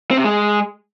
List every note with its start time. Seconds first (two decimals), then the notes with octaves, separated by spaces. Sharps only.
0.11 C4
0.17 C3
0.24 G#3